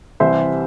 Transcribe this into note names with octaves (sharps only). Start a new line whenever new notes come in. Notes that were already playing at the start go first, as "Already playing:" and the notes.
C2 C3 E3 C5 E5